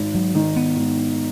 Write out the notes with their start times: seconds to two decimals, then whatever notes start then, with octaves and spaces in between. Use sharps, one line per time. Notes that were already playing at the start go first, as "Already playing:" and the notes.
Already playing: G#1
0.15 F#3
0.35 D#3
0.56 B3
0.76 G#1